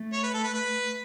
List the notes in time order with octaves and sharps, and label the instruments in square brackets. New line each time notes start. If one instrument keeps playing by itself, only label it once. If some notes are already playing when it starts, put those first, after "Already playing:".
Already playing: [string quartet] A3
[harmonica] C#5
B4
A4
B4
B4